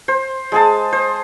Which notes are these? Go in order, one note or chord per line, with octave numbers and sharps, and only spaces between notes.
C5
G#3 G#4 A5
C5